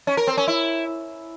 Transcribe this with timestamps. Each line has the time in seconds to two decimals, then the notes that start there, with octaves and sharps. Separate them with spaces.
0.07 C#4
0.17 A#4
0.27 C4
0.38 C#4
0.48 E4